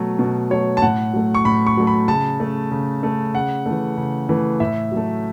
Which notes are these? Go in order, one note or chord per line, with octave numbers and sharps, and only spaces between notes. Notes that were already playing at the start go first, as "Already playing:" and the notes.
Already playing: B2 F#3 A3
B2
F#3 A3 C#5
A5
A2 F#5
F#3 A3
C#6
A2 B5
C#6
F#3 A3
B5
C#3 A5
A3
C#3
A3
C#3 F#5
E3 A3
C#3
E3 A3
A2 E5
F#3 A3